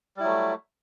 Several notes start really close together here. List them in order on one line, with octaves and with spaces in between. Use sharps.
G3 E4 F#3 A3